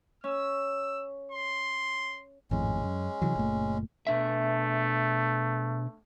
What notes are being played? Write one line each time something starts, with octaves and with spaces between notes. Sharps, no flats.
C#4 E6
C6
G#1 F2 A2 G#3 C#4
F#2
C3 E3 F#3
F#1 A#2 A3
B2 A3 D4 E5